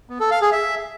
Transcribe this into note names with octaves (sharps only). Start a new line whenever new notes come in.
B3
A4
F5
G#4
E5